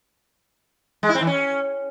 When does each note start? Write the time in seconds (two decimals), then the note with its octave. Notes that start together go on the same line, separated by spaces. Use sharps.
1.03 G#3
1.09 E4
1.15 C4
1.21 E3
1.27 C#4